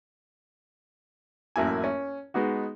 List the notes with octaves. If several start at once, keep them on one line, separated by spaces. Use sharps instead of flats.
A1 F#2 A#3 E4 G#5
C#4
G#3 B3 D#4 F#4